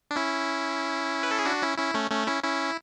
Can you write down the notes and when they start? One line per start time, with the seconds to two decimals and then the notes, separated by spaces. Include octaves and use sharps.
0.11 D4
0.16 C#4 E4
1.23 B4
1.31 A4
1.39 G#4
1.45 D4 F#4
1.62 C#4 E4
1.78 C#4 E4
1.94 A3 C#4
2.11 A3 C#4
2.27 C#4 E4
2.43 C#4 E4